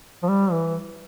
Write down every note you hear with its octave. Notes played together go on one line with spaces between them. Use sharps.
F3
G3
E3